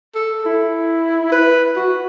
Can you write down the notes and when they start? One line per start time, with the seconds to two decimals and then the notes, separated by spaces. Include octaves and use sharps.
0.15 A4
0.45 E4
1.32 B4
1.76 F#4